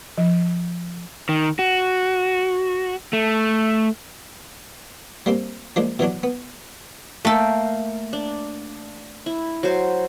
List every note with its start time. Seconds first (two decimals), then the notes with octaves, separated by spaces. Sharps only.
0.18 F3
1.29 D#3
1.59 F#4
3.13 A3
5.26 G3 A#3 C4
5.76 F3 G#3 A#3 D4
5.99 B2 E3 F#3 D4
6.23 B3
7.25 A3 A#3 A4 G5
8.13 D4
9.26 E4
9.63 F#3 C5